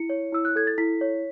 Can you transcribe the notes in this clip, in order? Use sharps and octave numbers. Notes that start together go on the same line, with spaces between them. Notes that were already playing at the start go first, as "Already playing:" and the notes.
Already playing: E4 C#7
C#5
E4 E6
F#6
A4 G#6
A6
E4 B6
C#5